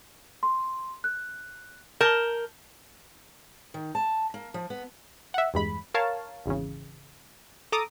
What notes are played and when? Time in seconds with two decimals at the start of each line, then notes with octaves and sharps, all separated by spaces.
0.43 C6
1.04 F#6
2.01 A#4 A5 G6 G7
3.74 D#3
3.95 A5
4.34 A#3
4.54 F3
4.70 B3
5.34 E5 F#5
5.54 E2 G2 G#3 B5
5.94 A#4 C#5 F5 A5
6.46 G#1 E2 C#3
7.72 A4 A#5 D6 D#6